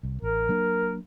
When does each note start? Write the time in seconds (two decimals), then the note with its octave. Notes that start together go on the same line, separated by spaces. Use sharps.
0.03 C2
0.22 A1 A#4
0.49 F#3 A#3 D4